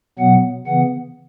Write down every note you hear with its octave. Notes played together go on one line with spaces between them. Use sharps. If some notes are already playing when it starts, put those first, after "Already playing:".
B2 F#3 B3 F#5
C#3 E3 B3 F#5